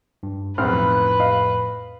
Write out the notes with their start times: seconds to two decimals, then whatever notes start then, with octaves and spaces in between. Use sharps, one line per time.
0.23 G2
0.58 B1 F2 A2 C4 B4 F6
1.20 D#5 F5